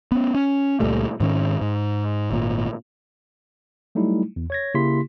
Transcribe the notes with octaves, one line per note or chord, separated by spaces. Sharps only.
B3 C#4
C#4
C#2 A#2 G3 A3
G#2 D#3 C#4
G#2
G#1 A#2
F#3 G3 A3 D#4 E4
E2
C#5 G#6 A#6
C#3 A#3 E4 G4 C6 B6